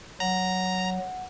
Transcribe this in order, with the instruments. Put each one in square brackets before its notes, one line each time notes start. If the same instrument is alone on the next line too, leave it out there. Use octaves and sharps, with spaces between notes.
[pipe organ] F#3 [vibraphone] F#5 [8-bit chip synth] A#5